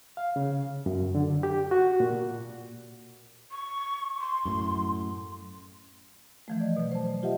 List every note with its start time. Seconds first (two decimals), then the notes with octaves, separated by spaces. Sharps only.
0.17 F5
0.36 C#3
0.86 F#2
1.15 D3
1.43 G4
1.71 F#4
2.00 A#2
3.51 C#6
4.19 C6
4.45 F#2 A2
6.48 E3 F3 A3
6.61 D5 D#5
6.77 B2 F#3
6.92 C5 A5
7.05 C5
7.23 F4 G4 D#5 E5 F#5